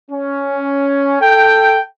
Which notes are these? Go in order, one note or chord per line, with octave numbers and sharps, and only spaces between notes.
C#4
A4 G5